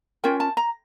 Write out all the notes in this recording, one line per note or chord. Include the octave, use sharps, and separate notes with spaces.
C#4 F4 A#4 G5
A5
A#5